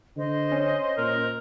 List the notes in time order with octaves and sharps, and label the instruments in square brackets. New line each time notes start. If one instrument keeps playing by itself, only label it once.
[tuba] D3 [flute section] C5 D#5
[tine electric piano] C#4
[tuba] A#2 [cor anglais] A#4